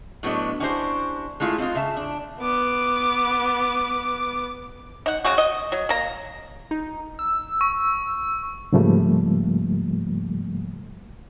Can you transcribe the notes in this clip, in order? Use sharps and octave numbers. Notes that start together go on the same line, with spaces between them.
A2 F#3 B3 D4 D#5
C#4 D4 E4 F#4 G4 C5
G#3 A3 E4 F4 E5 F5
C4 D#4 F4
C#3 E5 A5
D4
B3 D6
D#4 F#5
C#3 G#3 F#4
D#5
F#3
A#3 A#5
D#4
E6
C#6
G#2 C#3 F3 G3 A3 A#3